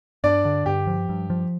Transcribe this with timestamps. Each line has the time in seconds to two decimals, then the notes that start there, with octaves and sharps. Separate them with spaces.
0.24 G2 D4 D5
0.45 D3
0.66 G2 G4
0.87 F3
1.09 G2
1.30 F3